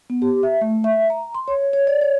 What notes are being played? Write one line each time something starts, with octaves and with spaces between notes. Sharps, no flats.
B3
G4
E5
A3
E5
A#5
C6
C#5
C#5
D5
C#5